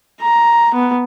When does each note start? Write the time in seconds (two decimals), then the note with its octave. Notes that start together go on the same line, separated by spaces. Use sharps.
0.21 A#5
0.74 B3